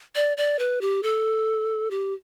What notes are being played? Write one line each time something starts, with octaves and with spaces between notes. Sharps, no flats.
D5
D5
B4
G4
A4
G4